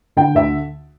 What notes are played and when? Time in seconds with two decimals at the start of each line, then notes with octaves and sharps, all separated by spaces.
0.17 D3 G5
0.35 D2 E5